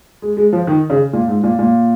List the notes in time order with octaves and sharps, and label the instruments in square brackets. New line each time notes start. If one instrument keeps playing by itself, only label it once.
[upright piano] G#3
G#3
F3
D#3
C#3
A#2
G#2
A#2
A#2